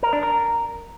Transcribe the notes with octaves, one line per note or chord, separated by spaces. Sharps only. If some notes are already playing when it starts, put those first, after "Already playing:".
A#4
D4
A#4